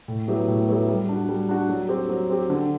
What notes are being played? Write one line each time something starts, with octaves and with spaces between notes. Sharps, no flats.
A2
F#3 B3 E4 G4
A2
F#3 B3 E4 G4
G3
D4 F#4
G3
D4 F#4
F#3
C4 G4
F#3
C4 G4
D3